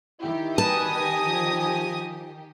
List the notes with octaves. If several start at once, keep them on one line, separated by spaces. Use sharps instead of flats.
D#3 E4 G4
B2 G3 B4 G#5 A5 D#6 A#6
F3